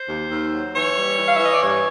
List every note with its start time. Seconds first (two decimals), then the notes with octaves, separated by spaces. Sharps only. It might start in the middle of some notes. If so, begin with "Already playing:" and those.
Already playing: C5
0.08 D#2
0.31 D#2
0.53 F#3
0.74 E3 C#5
0.96 G3
1.18 E3
1.28 F5
1.36 E3 E5
1.44 D#5
1.53 D5
1.61 G2 C#5